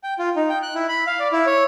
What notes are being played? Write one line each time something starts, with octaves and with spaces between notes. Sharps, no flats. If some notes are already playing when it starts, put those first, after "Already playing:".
G5
F4
D#4
G5
F#6
E4
B5
F5
D5
E4
C#5